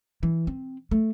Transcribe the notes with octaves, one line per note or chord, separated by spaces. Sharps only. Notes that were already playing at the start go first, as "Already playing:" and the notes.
E3
C4
A3